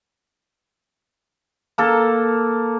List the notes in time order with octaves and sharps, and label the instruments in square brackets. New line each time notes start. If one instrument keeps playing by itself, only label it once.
[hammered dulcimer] A#3 A4